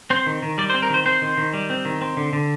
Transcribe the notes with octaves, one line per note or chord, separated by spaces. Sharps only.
C4 C5
D#3
D#3
G3 D5
C5
C4
A#4
D#3 C5
C4 C5
D#3
D#3
G3
C4
D#3
C4
D3
D3